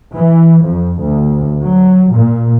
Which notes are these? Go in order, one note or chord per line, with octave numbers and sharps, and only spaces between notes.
E3
F2
D2
F#3
A#2